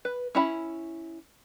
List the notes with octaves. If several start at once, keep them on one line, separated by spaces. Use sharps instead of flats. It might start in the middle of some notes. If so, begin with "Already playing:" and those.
B4
C#4 E4 A#5 B5